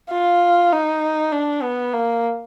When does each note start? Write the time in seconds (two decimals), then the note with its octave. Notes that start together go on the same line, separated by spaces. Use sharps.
0.11 F4
0.72 D#4
1.32 D4
1.63 B3
1.94 A#3